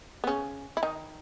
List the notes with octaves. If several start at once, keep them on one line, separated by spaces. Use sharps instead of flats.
B3
C#3 C#4
E4
D#3 D#4